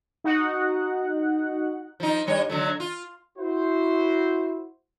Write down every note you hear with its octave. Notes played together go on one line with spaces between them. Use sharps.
D#4 F#4 F#5
F3 D#4
G2 G3 C#5
D3 F#3 A3
F4
E4 F#4 C5